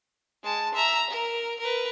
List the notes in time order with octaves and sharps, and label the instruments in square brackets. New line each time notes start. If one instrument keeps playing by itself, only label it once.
[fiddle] G#3 A5
E5 A#5
A#4
A#4 B4